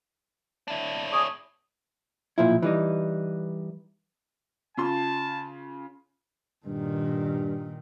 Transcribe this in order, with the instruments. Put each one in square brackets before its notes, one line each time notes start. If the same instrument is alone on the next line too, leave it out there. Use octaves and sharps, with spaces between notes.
[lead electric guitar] D4 E4
[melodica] G#4 C#5 D6
[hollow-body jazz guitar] B1 A#2 F3 E4
E3 G3 D#4
[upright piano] C#3 F4 C6 [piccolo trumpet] A5
[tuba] G2 [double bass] A#2 D#3